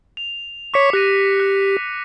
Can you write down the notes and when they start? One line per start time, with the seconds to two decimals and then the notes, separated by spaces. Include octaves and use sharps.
0.17 F7
0.74 C#5 C#6 D6 B6 C#7
0.93 G4 F#6 A#6 D#7
1.40 F#6